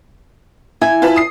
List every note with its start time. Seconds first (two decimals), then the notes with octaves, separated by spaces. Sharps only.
0.81 E4 G#5
1.02 F4 B4 A5
1.16 D#6 C7